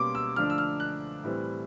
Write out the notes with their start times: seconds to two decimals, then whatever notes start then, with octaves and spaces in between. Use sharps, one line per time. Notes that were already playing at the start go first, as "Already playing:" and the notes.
Already playing: B2 G3 A#3 C#4 C6 D6
0.15 E6
0.36 D3 F3 A3 D4 F6
0.50 E6
0.58 F6
0.80 F#6
1.24 A2 E3 G3 C4